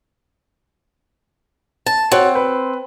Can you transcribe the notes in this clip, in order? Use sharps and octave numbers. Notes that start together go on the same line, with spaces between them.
A5
C4 F#4 C#5 F#5
B4